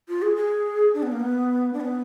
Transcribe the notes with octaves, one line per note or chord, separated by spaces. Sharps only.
F4
G#4
G#4
D4
B3
A#3
B3
D4
B3